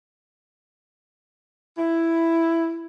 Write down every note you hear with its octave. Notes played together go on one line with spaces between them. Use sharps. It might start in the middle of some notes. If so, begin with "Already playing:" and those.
E4